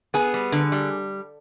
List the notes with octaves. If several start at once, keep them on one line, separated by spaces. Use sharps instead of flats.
B3 G#4
G3
D3
G3